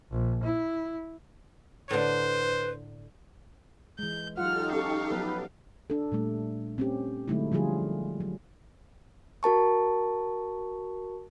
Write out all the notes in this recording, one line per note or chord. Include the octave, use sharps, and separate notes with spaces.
A#1
E4
A2 D3 B4 C5
E3 G#3 G6
F#3 D#4 F4 G4 A4 F#5 F6
C#4 F5 C#6
F3 F#3 B3 B4
D4 A4
A#2 G3 A3
C4 C#4 G4
D3 F#3 G#3 A3 D#4 E4
D3 F3 G3 F4 G#4
F#3
F#4 A#4 A5 C#6